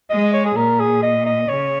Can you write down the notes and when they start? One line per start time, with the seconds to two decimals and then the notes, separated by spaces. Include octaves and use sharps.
0.10 G#3 D#5
0.33 C#5
0.45 G#4
0.56 A#2 A#4
0.80 G#4
1.03 D#5
1.26 D#5
1.49 C#3 C#5